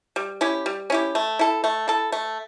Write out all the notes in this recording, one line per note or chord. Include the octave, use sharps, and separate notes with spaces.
G3
C#4 E4 G4
G3
C#4 E4 G4
A3
E4 A4
A3
E4 A4
A3